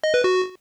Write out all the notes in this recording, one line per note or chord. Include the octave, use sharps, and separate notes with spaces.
D#5
B4
F#4